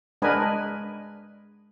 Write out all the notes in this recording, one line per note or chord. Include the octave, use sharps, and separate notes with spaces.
G#3 D4 A#4 B4 D#5 G#5